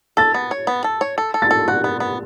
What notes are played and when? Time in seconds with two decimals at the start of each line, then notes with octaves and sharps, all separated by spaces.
0.17 A4 A6
0.34 B3
0.51 C#5
0.67 B3
0.84 A4
1.01 C#5
1.18 A4
1.34 A4
1.42 A6
1.51 A4
1.68 F#4 F#6
1.84 B3
2.00 B3